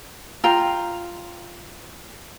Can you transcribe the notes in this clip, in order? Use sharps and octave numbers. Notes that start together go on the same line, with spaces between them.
F4 G5 A#5